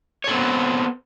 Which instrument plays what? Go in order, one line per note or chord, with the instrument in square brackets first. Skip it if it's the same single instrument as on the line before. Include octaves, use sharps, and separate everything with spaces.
[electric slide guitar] C#5
A4
C4
B3